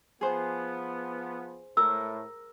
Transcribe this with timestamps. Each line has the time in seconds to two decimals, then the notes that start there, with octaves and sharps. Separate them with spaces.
0.21 F3 B3 G#4 C5
1.77 A2 A#4 E6